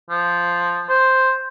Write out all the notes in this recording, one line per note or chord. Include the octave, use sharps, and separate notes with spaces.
F3
C5